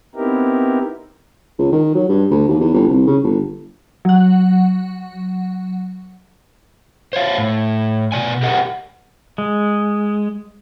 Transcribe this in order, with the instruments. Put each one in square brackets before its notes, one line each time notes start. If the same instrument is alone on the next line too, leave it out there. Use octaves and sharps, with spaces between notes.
[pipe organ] B3 C4 D#4 E4 G4 A#4
[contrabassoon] C#2
D#3
F#3
G2
D2
D#2
E2
G1
C2
C#3
G1
[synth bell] F#3 F#5
[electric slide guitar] C5 C#5 F5
A2
B2 G3 D5 G#5
G4 G#4 A#4 D#5 F#5
[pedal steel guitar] G#3